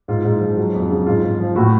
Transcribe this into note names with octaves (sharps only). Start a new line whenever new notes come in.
G#2 F4
G#2
F3
F#3
F2
C#3
G#2 F4
G#2
F3
A2 F#4